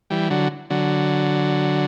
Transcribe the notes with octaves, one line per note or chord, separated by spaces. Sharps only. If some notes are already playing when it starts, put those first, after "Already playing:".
E3 G3
D3 F#3
D3 F#3